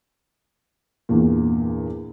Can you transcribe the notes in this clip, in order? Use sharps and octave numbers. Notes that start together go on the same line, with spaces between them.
E2 G2 A#2